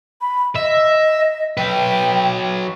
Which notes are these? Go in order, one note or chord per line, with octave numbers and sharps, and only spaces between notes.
B5
D#5 E5
F#3 B4 G5